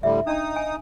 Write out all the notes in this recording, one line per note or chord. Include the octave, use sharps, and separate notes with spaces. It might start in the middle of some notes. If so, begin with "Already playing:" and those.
A2 D3 G3 E5
D4 D#4 A5 D#6
G#5